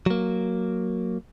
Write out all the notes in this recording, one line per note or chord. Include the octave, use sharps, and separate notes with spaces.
F#3 A#3